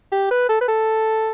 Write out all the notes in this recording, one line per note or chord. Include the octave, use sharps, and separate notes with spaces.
G4
B4
A4
B4
A4